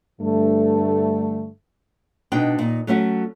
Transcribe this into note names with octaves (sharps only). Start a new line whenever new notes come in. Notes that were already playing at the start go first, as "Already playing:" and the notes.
G2 D3 A3
B2 D4 D#4 G5
A#2 D#4
F#3 A3 C#4 F#4